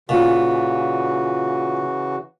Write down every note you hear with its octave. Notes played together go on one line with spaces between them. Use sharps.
A#2 C#3 E3 F#4